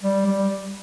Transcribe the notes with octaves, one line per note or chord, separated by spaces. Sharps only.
G3
G3